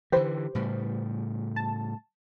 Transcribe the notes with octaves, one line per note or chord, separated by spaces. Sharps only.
D3 E3 G4 B4 C5
A2 C#3 G3
A5